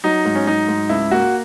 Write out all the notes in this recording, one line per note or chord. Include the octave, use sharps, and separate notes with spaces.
F#3 D#4
G#2
C#4
F#3 D#4
G#2
C#2 E4
A#3 F#4